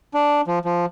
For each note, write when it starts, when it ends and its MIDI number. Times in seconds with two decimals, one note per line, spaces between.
0.14 0.41 62
0.47 0.59 53
0.65 0.86 53